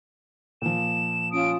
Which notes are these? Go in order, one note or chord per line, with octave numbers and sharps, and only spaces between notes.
A#2 F3 E7
C#4 F4 D#6 D7